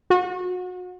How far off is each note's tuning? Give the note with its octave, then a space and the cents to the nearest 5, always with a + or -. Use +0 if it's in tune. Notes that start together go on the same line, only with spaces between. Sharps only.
F#4 -35